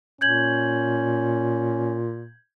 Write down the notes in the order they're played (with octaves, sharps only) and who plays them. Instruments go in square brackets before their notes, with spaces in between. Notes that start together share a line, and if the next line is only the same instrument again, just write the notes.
[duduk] A#2 [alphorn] C#4 [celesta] G6 G#6 F#7